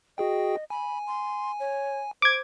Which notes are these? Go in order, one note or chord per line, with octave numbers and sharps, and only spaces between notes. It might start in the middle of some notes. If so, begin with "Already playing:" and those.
F#4 G#4 D#5 G5
G#5 B5
C6
C#5
C5 D6 G#6